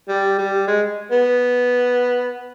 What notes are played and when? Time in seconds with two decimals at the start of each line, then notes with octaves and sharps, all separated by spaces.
0.09 G3
0.38 G3
0.67 G#3
1.12 B3